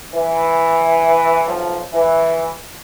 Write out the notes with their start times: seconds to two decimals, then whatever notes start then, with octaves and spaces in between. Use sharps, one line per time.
0.14 E3
1.46 B1 F3
1.93 E3